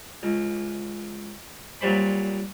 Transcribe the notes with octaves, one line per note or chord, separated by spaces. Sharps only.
C#2
A#2 F#3 G3 C5 B5